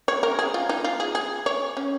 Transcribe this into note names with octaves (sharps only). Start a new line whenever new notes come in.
C#5
A#4
G#4
F4
D#4
F4
G#4
G#4
C#5
C#4